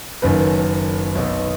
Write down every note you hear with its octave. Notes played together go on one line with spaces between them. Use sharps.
F#1 F#2 D#3 B4
B1 B2 B3